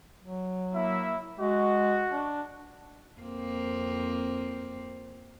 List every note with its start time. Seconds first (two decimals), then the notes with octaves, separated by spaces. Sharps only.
0.24 F#3
0.73 A#3 E4 E5
1.39 G#3 F#4
2.12 D4
3.20 F2 A#3 C4